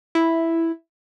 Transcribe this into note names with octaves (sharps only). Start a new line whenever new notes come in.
E4